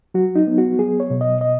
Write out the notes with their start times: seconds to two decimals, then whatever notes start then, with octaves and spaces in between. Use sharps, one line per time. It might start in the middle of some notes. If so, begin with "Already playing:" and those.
0.14 F#3 F#4
0.36 D#4
0.47 B3
0.58 F#4
0.79 F#3 G#4
1.00 C#5
1.10 B2
1.21 D#5
1.41 D#5